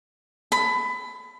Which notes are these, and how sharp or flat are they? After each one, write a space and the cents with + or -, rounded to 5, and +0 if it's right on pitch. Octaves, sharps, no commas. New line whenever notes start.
B5 +20